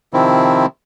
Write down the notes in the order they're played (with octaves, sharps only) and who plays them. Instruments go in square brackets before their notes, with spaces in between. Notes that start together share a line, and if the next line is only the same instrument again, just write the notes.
[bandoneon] C3 D#3 F3 C4 E4